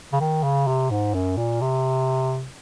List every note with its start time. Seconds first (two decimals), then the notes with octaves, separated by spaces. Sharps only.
0.13 C#3
0.20 D#3
0.43 C#3
0.67 C3
0.91 G#2
1.14 F#2
1.37 A#2
1.61 C3